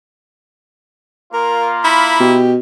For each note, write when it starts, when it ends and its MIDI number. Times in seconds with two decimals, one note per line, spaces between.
1.34 2.34 58
1.34 2.34 65
1.34 1.69 70
1.84 2.38 64
1.84 2.20 83
2.21 2.58 47
2.21 2.52 67